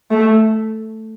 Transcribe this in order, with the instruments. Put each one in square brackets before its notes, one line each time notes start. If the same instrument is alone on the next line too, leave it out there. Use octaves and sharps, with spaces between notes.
[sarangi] A3